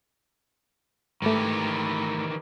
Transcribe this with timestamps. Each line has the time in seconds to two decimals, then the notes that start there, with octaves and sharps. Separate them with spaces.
1.22 G#2 D#3 E3 A3 G4